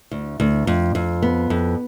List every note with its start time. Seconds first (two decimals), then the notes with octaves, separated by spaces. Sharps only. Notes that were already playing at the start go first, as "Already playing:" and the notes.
0.11 D2
0.40 D2
0.67 F2
0.95 F2
1.22 B3
1.50 F2